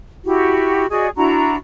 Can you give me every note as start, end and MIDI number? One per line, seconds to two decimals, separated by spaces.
0.25 0.87 64
0.25 0.87 66
0.25 0.87 67
0.90 1.08 66
0.90 1.08 68
0.90 1.08 74
0.90 1.08 75
1.16 1.56 62
1.16 1.56 64
1.16 1.56 66
1.16 1.56 82